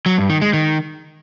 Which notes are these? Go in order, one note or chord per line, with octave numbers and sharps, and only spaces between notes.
F#3
G2
D#3
G#3
D#3